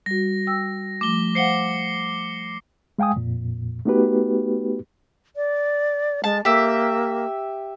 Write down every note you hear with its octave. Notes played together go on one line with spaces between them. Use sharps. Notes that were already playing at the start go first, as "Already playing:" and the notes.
G3 F#4 A#6
G5 E6
F3 A3 D6 G7
C5 F5 F#5 C7 C#7 G7
G#3 F5 G5 G#5 D#6
F2 A#2
A3 B3 D#4 F#4 G4 B4
D5
G#3 A5
A#3 G4 E5